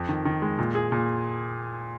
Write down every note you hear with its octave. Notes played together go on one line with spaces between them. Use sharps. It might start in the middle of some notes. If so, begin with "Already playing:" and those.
Already playing: F2
D#3
D#3
G#3
A#2
G#4
A#2